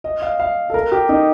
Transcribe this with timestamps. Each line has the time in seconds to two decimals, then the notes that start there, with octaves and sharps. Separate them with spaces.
0.04 D#5
0.22 F5
0.40 F5
0.70 A4
0.74 A#4
0.92 G4
1.09 D#4